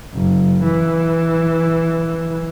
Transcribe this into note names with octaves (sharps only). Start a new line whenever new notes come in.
F#1
E3